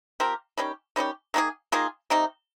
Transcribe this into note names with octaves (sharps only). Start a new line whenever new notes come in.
F3 C4 G4 A#4
D#3 G3 C#4 G4
D#3 G3 C#4 G4
D#3 A#3 F4 G#4
D#3 A#3 F4 G#4
C3 D#3 A#3 D#4